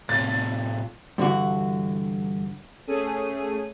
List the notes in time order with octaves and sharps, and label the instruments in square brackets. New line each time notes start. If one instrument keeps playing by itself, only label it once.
[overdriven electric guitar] A2 C3 [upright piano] A6
[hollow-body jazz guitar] G2 D3 E3 F#4
[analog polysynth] A3 C#4 G#4 D#7